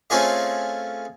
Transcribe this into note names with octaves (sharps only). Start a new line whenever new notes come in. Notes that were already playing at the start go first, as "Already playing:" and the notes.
A3 C4 C#4 F4 G#4 D#5